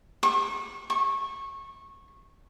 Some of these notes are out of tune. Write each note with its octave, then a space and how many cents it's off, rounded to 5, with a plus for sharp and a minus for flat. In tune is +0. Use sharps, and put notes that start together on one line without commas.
C#6 -30
C#6 -20